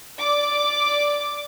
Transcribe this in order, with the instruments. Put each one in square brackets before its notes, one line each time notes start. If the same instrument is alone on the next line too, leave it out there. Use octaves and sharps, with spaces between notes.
[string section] D5 D6